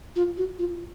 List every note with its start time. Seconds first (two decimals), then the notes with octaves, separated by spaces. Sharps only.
0.16 F4
0.37 F#4
0.59 F4